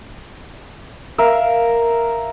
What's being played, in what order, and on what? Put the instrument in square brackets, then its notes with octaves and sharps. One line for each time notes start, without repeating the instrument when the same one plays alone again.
[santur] A#4 E5 F5